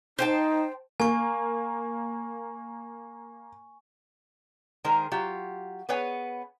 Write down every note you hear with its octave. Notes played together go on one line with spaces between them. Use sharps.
D#4 C5 G5 A5
A#3 G#5 C#6
D#3 G#3 G#4 A#4 C5
F#3 F4 G4
B3 G#4 B4 C#5 G#5